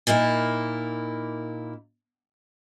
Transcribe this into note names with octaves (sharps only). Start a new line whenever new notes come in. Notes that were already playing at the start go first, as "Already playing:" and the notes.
A#2 A#3 D#4 E4